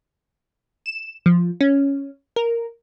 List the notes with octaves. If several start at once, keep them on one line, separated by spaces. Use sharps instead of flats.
E7
F3
C#4
A#4